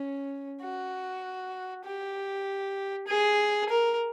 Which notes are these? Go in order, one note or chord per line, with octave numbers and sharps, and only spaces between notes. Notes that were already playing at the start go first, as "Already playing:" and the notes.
Already playing: C#4
F#4
G4
G#4
A#4